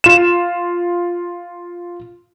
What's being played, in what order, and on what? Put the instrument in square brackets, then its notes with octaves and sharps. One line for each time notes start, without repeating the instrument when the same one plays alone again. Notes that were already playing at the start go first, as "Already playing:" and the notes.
[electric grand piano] F4 E7